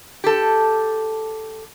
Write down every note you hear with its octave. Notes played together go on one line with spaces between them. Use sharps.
G4 A4